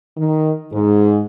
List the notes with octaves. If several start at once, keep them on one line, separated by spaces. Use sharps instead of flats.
D#3
G#2